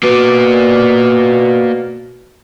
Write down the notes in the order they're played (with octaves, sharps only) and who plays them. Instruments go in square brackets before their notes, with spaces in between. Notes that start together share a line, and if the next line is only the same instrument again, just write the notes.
[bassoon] B2 [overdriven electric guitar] A#3 D5